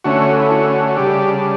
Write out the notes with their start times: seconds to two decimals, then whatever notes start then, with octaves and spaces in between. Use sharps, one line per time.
0.04 D3 A3 C#4 F#4
0.40 E4
0.51 F#4
0.88 F#4
0.97 C#3 G3 D4 G4